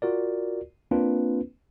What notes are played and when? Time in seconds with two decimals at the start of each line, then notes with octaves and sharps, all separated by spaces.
0.02 F4 F#4 A#4 D5
0.91 A#3 C4 D4 F4 B4